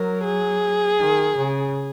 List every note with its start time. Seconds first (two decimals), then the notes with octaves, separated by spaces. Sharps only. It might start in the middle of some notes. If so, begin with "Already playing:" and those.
Already playing: F#3 A#4
0.24 G#4
0.99 D#3
1.36 C#3